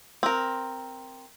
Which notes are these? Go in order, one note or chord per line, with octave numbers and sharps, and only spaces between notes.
C4 A#4